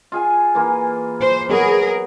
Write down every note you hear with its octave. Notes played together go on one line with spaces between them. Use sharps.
F4 G#4 G#5
E3 A#3 F4
C5
F#3 B3 G#4 A#4 B5